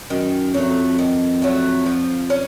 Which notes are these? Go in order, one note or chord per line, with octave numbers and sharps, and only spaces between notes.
F#2 D#3
F2 F#3 A3
D#3
F#3 A3
F3
C#4